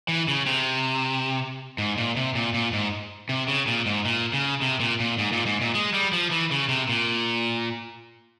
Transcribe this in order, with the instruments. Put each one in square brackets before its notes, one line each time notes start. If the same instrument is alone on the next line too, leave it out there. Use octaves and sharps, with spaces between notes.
[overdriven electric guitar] E3
C#3
C3
G#2
A#2
C3
A#2
A#2
G#2
C3
C#3
A#2
G#2
A#2
C#3
C3
A#2
A#2
G#2
A#2
G#2
A#2
G#3
G3
F3
E3
C#3
C3
A#2